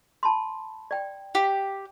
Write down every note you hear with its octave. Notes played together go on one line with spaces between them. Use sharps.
A5 B5 C6
D5 G5
G4 F5